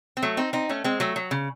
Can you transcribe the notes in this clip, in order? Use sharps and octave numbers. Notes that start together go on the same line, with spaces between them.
C4
F#3 A3
C4 D#4
C4 D#4
A3 C#4
G#3 C4
F#3 A3
F#3
C#3